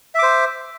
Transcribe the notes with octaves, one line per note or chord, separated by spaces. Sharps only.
C5 E5 D6